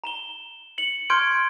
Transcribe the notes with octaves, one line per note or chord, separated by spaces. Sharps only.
A#5 E7 G7
C#7 F#7
C6 C#6 F6 G6 G#6 D7